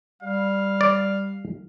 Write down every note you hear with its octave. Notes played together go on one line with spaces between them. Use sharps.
G3 F5
D5